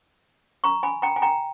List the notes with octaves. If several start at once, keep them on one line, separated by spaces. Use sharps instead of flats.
A#5 C#6
G#5 B5
G5 A#5
G#5
G5 A#5